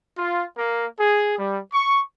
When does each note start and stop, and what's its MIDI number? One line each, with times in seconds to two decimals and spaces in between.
0.18 0.45 65
0.57 0.86 58
1.00 1.38 68
1.39 1.60 55
1.74 2.01 85